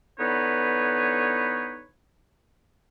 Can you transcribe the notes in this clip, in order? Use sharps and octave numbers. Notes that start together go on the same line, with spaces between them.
D3 E3 B3 D#4 B4 C#5